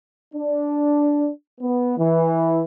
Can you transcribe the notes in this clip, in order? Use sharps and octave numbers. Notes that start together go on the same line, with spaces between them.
D4
B3
E3